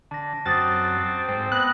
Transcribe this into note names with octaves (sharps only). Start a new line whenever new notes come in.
D3 A5 A#6
F#2 C4 F#4 D6 D#6 F6 A6
G#2 C4
B3 D#6 F#6 A#6